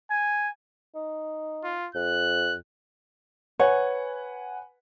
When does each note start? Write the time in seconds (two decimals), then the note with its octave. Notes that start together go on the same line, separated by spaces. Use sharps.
0.10 G#5
0.95 D#4
1.64 F4
1.95 F2 F#6
3.59 B4 C#5 F#5 G#5